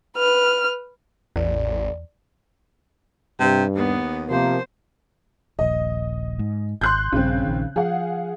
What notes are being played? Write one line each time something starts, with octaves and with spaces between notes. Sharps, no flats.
B4 F6
A1 E2 D5
G2 C3
D#2 B3
C3 F3 A#3 C5
D#1 A#1 D#5
G#2
G#1 C6 F#6 G6
A#1 G2 C#3 C4
A#1 D#3
F3 G#4 F5 F#5